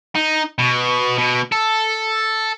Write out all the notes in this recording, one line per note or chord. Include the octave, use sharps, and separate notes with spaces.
D#4
B2
B2
A4